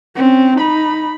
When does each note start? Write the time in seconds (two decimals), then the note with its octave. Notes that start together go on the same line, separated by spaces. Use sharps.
0.15 C4 C#4
0.56 D#4 B5